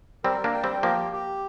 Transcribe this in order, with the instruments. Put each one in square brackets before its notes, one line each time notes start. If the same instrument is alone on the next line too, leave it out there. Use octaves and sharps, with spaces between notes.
[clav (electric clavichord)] G3 C4 [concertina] A#4
[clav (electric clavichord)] A#3 D4
[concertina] G5
[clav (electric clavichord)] G3 C4
[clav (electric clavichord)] F3 A#3 [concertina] G4
[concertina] G4